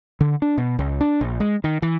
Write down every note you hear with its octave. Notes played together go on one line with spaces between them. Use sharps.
D3
D4
B2
C#2
D4
A#1
G#3
D#3
E3